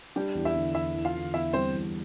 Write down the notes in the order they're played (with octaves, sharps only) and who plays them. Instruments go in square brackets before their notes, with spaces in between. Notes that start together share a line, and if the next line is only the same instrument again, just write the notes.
[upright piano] G3 G4 [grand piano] D4
[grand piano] E2
[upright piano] E4 E5
[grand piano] D3
[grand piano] E2 [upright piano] E4 E5
[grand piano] E2
[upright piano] F4 F5
[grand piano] D3
[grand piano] E2 [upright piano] E4 E5
[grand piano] G3 [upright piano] C4 C5
[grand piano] E2